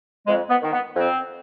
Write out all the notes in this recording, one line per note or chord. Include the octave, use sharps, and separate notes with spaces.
F2 G#3
B3
D#3
B3
F2 C4